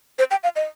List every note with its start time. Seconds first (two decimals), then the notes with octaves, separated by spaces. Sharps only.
0.19 C5
0.31 G5
0.43 F5
0.56 D#5